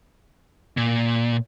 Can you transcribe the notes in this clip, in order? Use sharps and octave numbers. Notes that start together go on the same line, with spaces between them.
A#2